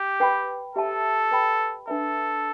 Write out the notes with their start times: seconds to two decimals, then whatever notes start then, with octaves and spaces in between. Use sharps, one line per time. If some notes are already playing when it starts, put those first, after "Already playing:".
Already playing: G4
0.20 B4 G5 B5
0.75 G4 A4 E5 A5
1.32 B4 G5 B5
1.88 D4 A4 B4 E5